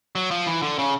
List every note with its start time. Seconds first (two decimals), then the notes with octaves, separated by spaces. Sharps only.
0.15 F#3
0.31 F3
0.47 E3
0.62 D3
0.78 C#3